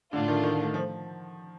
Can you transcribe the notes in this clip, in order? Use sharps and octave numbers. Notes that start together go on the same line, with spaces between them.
A2 D3 A3 D4 F4
D#3
D#3
F3